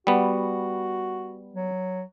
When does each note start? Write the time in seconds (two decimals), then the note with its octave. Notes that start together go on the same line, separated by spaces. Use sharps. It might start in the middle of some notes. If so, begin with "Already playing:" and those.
0.07 G3 B3 F#4
1.54 F#3